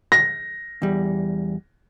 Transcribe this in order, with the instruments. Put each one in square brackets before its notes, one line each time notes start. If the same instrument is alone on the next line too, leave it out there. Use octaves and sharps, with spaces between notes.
[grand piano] A#6
[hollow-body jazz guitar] E2 G3